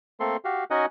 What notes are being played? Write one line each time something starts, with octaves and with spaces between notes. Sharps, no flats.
A3 A#3 C4 A4 C6
F#4 G4 F5
C#4 D#4 F#4 D#5 F#5 G#5